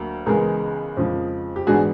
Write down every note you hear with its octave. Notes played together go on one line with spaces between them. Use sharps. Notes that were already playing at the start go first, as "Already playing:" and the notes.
Already playing: D2 F#3 A#3
C#2 C#3 E3 G#3 B3 G#4 A#4
F2 C#3 F3 G#3
G4
G#2 E3 G#3 B3 D4 F#4 G#4